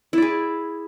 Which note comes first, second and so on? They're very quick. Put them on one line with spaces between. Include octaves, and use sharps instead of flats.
E4 D5 G#4